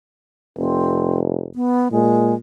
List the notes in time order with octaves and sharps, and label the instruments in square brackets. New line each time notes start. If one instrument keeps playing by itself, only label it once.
[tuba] F1 [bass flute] C4
[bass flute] B3
[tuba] A#2 [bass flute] G#3